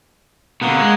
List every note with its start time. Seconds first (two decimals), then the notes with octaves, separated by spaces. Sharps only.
0.61 B2 D3 A#3 F#5 D#6
0.80 G#3